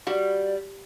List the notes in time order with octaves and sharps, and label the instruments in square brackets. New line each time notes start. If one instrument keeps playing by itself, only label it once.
[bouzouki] G3 [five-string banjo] F#4 [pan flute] D5